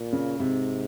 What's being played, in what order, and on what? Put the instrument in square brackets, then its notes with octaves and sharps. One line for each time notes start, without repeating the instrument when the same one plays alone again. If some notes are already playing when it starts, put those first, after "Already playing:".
Already playing: [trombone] A#2
[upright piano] C#3
[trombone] G#2 [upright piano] C3